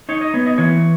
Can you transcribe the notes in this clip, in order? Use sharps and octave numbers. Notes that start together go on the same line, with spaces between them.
D#4 C#5
D#5
B3 C#5
D#5
E3 C#5